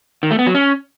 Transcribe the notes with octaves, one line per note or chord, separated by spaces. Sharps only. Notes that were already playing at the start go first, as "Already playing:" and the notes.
D#3
A3
B3
F#3
C#4